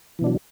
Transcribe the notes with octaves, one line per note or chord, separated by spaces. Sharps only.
B2 E3 F#3 D4